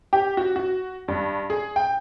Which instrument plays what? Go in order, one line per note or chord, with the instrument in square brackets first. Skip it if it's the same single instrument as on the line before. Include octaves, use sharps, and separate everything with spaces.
[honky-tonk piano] G4
F#4
F#4
G2
G#4
G5